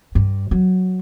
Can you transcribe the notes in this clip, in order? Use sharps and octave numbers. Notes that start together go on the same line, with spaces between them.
G2
F#3